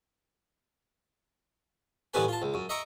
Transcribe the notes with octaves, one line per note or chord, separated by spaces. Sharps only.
A1 G2 D3 B3 B4 G#5
F4 A5
C#2
F#2
D#5 E5 A#5 C#6 D6